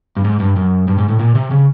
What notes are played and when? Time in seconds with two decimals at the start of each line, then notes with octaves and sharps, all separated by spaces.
0.17 G2
0.24 G#2
0.40 G2
0.56 F#2
0.88 G2
0.98 G#2
1.09 A2
1.19 A#2
1.35 C3
1.51 C#3